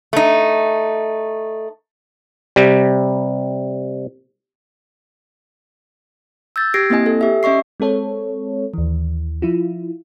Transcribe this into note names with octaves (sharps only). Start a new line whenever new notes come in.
A3 D#4
C3 G3
E6 G6 A6
G4 G#6 A#6 C7 D7
A#3 C4 E4 D#5 G#5
A4
G4 E5
C#4 D#5 E5 C#6 C7
G#3 C4 A4 C#5
D#2 E3
F3 E4 F4